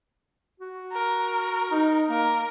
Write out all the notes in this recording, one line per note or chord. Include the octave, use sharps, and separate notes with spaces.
F#4
A#4
D#4
A#3 A#4